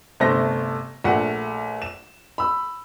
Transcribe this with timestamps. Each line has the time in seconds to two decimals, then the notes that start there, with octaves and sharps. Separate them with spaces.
0.20 G1 C3 A3 C5 A#6
1.04 A#1 A3 F#5
1.82 E7
2.38 B5 E6